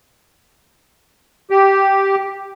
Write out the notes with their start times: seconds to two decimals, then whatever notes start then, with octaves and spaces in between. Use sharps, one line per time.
1.50 G4